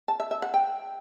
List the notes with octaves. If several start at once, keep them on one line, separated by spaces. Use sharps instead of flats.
A5
E5
E5
F#5
G5